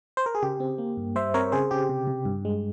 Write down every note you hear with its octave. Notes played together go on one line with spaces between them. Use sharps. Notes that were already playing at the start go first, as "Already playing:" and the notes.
C5
A#4
G#4
C#3 G4
C4
A#3
G2
G3 C5 E5
C4 A#4 C#5
C#3 G#4 C5
C#3 G4
C3
C3
G2
G#3